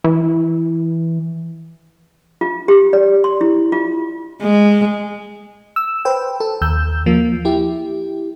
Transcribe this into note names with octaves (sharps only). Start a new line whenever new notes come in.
E3
F4
G4
D5
C6
E4
F4
G#3
E6
B4 C5 G5
A4
D#2 E6 G6
F3 A#3
E4 G4